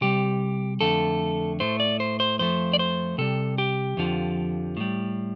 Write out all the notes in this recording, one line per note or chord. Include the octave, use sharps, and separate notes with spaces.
C3 G3 G4
F2 D3 A3 A4
A2 A3 C5
D5
C5
C5
F2 F3 A3 C5
D5
C5
C3 G3 A4
G4
F2 D3 F3
A2 G3